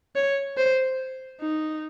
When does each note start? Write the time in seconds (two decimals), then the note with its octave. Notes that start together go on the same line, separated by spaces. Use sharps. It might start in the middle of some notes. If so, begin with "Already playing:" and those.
0.16 C#5
0.57 C5
1.41 D#4